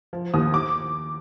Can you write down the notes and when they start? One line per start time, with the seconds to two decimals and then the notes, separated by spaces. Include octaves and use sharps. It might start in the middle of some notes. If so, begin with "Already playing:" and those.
0.13 F3
0.34 D#2 D#6
0.54 D6